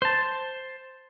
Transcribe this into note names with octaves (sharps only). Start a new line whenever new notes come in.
C5 A5